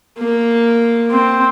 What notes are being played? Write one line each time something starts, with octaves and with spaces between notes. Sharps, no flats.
A#3
C4